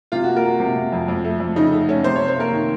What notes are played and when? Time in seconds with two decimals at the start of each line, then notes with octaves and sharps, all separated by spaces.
0.12 C3 F4
0.24 A#3 F#4
0.36 A#4
0.44 A#3 F#4
0.60 C3
0.76 C3
0.92 F2
1.08 F2
1.24 A3
1.40 F2
1.56 C#3 D#4
1.72 A3
1.88 A3 C#4
2.04 C3 C5
2.16 C3 C#5
2.28 C5
2.36 A#3 A#4
2.52 D#3